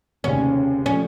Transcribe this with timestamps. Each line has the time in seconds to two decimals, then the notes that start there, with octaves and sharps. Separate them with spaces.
0.24 F1 D#2 C#3 C#4
0.86 F3 A3 C#4